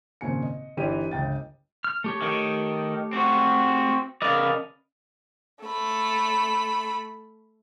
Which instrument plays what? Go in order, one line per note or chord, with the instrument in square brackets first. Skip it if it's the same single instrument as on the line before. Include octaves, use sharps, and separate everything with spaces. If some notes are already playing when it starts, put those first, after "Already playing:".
[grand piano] G#1 A#2 C#3 G#5 C#7
D#5
G1 E3 D#4 G4 D5 D#7
G1 C#2 G5 A6
[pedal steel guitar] F6
A3 G4 C#5
[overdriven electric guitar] D#3
C4 F#4
[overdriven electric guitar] C#3 D5 [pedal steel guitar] A#4 B4 D#5
[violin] A3 B5